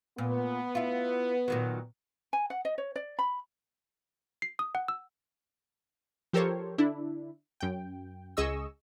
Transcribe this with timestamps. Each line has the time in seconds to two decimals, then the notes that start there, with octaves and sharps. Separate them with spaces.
0.18 A#2 B3
0.75 E4 F4
1.48 A#2 D#3 F#3
2.33 G#5
2.50 F#5
2.65 D#5
2.78 C#5
2.96 D5
3.19 B5
4.42 C7
4.59 D#6
4.75 F#5
4.88 E6
6.33 F3 G4 A4 A#4 C5 C#5
6.78 D3 D4 E4
7.60 F#2 G5
8.37 C#2 G#4 D#5 C#6 E6